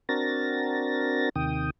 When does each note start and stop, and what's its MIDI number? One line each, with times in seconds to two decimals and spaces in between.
0.09 1.29 60
0.09 1.29 62
0.09 1.29 66
0.09 1.29 70
0.09 1.29 93
0.09 1.29 94
1.36 1.70 39
1.36 1.70 48
1.36 1.70 51
1.36 1.70 79
1.36 1.70 87